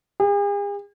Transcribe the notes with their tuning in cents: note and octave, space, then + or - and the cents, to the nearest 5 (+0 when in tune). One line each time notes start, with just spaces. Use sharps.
G#4 -45